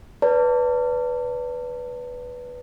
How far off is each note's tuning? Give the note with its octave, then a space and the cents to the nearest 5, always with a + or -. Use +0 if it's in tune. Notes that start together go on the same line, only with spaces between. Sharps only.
B4 +0 D5 -35 A5 +35